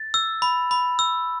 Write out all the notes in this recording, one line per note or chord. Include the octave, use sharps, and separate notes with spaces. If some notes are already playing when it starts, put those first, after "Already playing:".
Already playing: A6
E6
B5
B5
E6